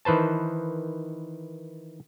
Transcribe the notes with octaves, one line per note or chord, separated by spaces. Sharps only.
D#3 E3 B4 C5 A5